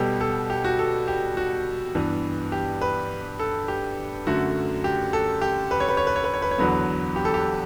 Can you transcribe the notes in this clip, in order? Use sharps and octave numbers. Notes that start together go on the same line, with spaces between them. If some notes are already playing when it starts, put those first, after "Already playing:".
Already playing: B2 G3 B3 G4 A4
A4
G4
F#4
A4
G4
F#4
G2 E3 B3
G4
B4
A4
G4
F#2 D3 A3 F#4
G4
A4
G4
B4
C#5
B4
C#5
B4
C#5
B4
C#5
B4
C#5
E2 D3 F#3 B3 B4
G4
A4
G4